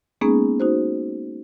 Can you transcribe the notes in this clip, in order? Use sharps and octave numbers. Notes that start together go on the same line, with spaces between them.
G#3 A#3 B3 C#4 D#4 G#4
D#4 F#4 C5